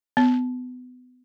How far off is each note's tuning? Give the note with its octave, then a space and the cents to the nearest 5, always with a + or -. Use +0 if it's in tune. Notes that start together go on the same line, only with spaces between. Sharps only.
B3 +25